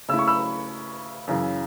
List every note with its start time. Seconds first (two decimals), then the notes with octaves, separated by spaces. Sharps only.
0.09 C#3 A3 E4 E6
0.19 C#6
0.28 B5 E6
1.27 F#2 C#3 E3